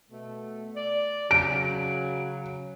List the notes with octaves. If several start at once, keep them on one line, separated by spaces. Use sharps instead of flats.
B2 A3
D5
C#3 F#3 D7